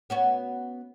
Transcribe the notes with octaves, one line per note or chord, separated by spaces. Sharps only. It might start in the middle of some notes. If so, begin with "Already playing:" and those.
B3 C#4 F#4